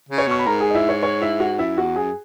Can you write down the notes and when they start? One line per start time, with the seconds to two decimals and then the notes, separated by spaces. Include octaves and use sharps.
0.09 C#3
0.18 C#5
0.27 B2 C#6
0.39 B5
0.46 G#2 A#4 A#5
0.60 G#4 G#5
0.70 D#5
0.74 E4 E5
0.89 C#5
1.03 C#5
1.21 E4 E5
1.40 F#4 F#5
1.59 F#2 E4 E5
1.77 E2 F#4 F#5
1.96 F#2 G#4 G#5